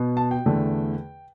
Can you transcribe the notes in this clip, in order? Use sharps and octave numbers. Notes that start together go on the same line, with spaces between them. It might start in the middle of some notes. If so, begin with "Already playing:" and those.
Already playing: B2 B3
A5
G5
E2 D3 A3